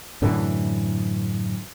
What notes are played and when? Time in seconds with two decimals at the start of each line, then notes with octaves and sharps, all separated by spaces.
0.22 F#2 A2 D3 E3